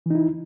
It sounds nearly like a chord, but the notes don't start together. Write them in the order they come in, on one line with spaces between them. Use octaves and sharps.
E3 D#4 E4